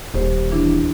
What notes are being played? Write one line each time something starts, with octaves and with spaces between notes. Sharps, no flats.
D#1 G4 C5
E3 D4 E4